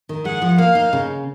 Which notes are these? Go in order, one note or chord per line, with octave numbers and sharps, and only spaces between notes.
D#3
G#3 F#5
F3
A#3 F5
D#4
C#3